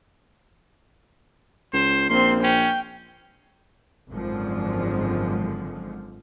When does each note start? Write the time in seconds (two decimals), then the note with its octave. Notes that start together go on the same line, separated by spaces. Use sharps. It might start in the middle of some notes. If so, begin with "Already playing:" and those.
1.73 C#2 C5
2.10 A#1 A#3 C4 C6
2.43 C#4 G5
4.10 G#1 F#2 D3 F3 G#3